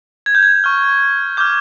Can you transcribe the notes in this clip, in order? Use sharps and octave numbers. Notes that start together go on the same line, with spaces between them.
G#6
G6
G#6
C#6 F6
D6 F6 G6